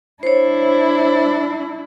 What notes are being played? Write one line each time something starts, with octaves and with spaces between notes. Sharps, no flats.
D4 E4 C5 C#5